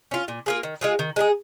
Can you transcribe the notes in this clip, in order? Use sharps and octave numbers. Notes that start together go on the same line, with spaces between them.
C#4 F4
A#2
A#3 F4 G#4
D#3
G#3 F4 G#4
D#3
G#3 D#4 G#4